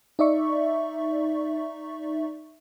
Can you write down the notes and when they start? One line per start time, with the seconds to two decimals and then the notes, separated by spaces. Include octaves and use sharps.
0.19 D#4 D5 E5 C#6